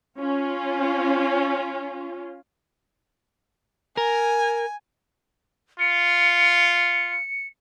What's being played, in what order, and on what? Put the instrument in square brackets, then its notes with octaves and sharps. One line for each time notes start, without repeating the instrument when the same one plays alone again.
[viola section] C#4 F4
[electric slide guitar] A#4 [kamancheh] G#5
[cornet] F4 [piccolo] C#7